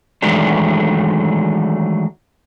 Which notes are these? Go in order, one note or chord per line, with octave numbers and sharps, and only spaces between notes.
D#3 E3 F#3 G#3 A3 D4